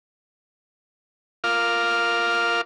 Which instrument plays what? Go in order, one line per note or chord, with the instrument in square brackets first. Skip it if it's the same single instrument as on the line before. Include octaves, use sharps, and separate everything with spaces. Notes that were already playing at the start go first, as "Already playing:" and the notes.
[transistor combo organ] F4 A#4 F5 D6 F6